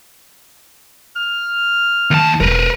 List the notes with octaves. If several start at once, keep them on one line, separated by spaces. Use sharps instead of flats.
F6
D#2 A5
E1 A#4 B4